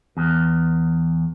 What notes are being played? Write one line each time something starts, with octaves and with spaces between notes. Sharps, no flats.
E2